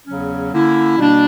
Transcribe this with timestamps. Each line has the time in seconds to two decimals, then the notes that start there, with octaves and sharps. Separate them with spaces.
0.07 E2 C#3 F#3 C#4
0.52 D3 A#3 C#4 E4
0.98 B2 G3 A#3 D4